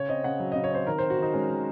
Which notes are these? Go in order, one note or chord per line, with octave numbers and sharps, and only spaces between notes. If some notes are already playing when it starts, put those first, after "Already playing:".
Already playing: C#3 C#5
C4 D#5
C#3 F#5
F#3
C#3 D#5
C#5
C4 C5
D#3 A#4
C4 C5
F#4
D#3 D#4
G#3 C#4
D#3